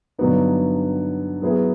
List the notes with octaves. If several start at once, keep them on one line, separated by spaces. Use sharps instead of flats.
G2 D3 F#3 B3 D#4
F#3 B3 E4 G#4